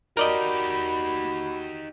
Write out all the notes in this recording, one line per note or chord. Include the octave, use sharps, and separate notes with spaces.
D#4 F#4 G4 A#4 D5 D#5 B5